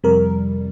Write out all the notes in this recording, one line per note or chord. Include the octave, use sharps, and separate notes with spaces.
F2 C3 G3 A#4